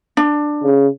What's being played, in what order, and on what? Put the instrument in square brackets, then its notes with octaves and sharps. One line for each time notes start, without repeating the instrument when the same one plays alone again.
[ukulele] D4
[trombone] C#3